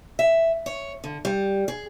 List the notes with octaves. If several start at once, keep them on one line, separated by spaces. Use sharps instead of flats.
E5
C#5
D3
G3
G#4